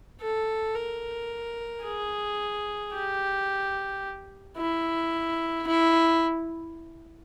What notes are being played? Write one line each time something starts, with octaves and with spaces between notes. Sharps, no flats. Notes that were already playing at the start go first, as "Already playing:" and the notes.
A4
A#4
G#4
G4
E4
E4